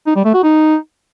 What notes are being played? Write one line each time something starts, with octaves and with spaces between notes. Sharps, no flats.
D#4
G3
A3
F#4
D#4